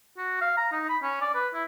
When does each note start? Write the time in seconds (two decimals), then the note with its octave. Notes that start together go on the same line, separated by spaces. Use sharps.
0.17 F#4
0.41 F5
0.57 A#5
0.72 D#4
0.89 B5
1.03 C#4
1.21 D5
1.34 B4
1.54 E4